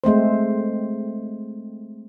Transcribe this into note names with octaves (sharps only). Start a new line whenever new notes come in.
G#3 A3 C4 C5